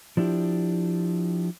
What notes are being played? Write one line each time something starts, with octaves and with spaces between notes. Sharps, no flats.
F3 D4 E4 G4